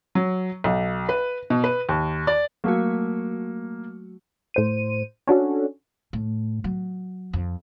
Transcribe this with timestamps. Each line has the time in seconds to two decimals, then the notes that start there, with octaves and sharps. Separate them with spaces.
0.15 F#3
0.64 B1
1.09 B4
1.50 B2
1.64 B4
1.89 D#2
2.27 D5
2.64 F#3 A3 A#3 F#4
4.54 A2 C5 D#7
5.27 C#4 D4 F#4 A4
6.13 A2
6.64 F#3
7.33 F2